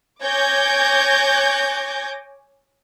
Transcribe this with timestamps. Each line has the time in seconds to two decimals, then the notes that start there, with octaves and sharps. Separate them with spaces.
0.23 C#5 G#5 D6 G6 G#6 A#6